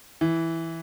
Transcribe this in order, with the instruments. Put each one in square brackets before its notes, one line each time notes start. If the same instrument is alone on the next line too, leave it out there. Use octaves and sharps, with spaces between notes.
[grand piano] E3